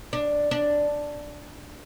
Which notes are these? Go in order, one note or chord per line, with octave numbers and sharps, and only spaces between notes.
D4
D4